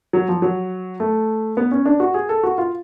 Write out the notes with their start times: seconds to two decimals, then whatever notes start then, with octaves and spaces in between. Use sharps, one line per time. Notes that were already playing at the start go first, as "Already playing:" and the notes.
0.13 F#3
0.28 F3
0.42 F#3
1.00 A3
1.57 B3
1.71 C#4
1.86 D4
2.00 F#4
2.14 G#4
2.29 A4
2.43 F#4
2.58 F4